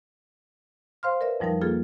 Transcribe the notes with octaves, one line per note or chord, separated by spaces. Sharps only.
C5 F5 C6 F6
A#4 B4 D5 E5
F2 F3 G3 D#4 A#4
A#3 F4 G#4 A4